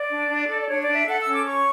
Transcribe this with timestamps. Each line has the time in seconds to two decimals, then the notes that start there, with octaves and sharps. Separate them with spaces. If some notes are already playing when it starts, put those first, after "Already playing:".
Already playing: D5
0.10 D4
0.29 D4
0.48 A4
0.61 D5
0.67 D4 C#5
0.81 D5
0.87 D4
0.94 E5
1.06 A4 F#5
1.19 E6
1.25 C#4
1.32 D6
1.45 C#5 C#6